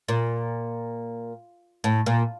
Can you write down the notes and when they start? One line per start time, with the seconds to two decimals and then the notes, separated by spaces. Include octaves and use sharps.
0.08 A#2
1.84 A2
2.06 A#2